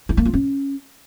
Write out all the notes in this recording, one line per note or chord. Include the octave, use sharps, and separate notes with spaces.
E4
A#3
F4
C#4